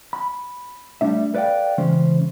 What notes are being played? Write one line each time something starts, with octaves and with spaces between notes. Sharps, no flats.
B5
G3 A3 D4 E5
A4 B4 D5 E5 F5 G5
C#3 E3 G#3 C#4 C5